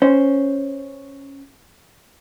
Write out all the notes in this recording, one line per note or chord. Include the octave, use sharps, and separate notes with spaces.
C#4 C5